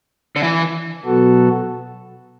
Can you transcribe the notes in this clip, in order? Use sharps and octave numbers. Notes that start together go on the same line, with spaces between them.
D3
E3
B2 F#3 B3 F#4 A4